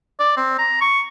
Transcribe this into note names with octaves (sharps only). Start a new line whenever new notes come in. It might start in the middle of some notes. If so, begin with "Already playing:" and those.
D5
C4
A#5
C#6